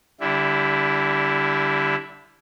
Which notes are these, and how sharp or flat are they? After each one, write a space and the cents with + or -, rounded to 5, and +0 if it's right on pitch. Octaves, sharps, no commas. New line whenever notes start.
D3 -20 G3 +0 E4 +5